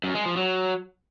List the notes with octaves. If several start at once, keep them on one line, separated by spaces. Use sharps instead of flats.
F#2
G#3
F3
F#3